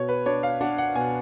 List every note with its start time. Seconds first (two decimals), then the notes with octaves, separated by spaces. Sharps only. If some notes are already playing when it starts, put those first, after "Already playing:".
Already playing: B2 C#5
0.09 B4
0.26 D4 C#5
0.43 F5
0.61 D4 F#5
0.78 F#5
0.95 B2 G#5